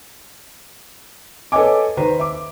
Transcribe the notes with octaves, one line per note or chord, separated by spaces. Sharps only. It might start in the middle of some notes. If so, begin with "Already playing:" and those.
A4 B4 C#5 D#5 G#5 D6
D#3 B4 C5 A#5
E5 D6